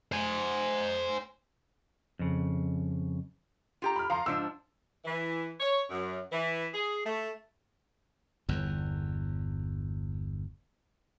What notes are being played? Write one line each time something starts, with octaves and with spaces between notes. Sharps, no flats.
C5 G#5
F2 C#3
F4 G4 A#5
B5 F6
F3 F5 A#5 C6
G#2 F3 D4 E6
E3
C#5
F#2
E3
G#4
A3
G1 E2